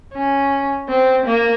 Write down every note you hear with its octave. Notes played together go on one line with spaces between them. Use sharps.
C#4
C4
A#3